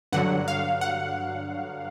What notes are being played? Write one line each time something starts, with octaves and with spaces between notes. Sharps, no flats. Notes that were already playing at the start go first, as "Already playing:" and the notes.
G2 D3 F#3 F#5
F5
F#5